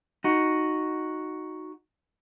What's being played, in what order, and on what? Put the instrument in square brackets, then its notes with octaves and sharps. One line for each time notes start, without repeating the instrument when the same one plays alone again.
[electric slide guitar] D#4 F#4